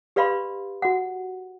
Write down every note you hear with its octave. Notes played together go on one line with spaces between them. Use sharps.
G4 B4 D5 F5 B5 C6
F#4 F#5